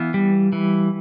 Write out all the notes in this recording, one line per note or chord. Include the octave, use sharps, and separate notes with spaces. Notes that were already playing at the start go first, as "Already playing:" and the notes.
Already playing: E3 B3 F5
G3
E3